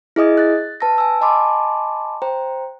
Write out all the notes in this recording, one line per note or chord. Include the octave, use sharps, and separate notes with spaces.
E4 G#4 D#5 D#6 G#6
F#6 A6
B4 A5 E6 A#6
G#5 E6
D#5 G#5 A5 B5 C6 D6
C5 G5 A#5